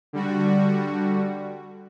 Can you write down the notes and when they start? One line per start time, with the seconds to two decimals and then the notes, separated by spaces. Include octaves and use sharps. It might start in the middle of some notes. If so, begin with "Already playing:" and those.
0.13 D3 G3 F#4